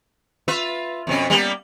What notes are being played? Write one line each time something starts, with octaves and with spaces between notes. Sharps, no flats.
F4 B4 E5
F2 B2 C#4
G3 A#3 B3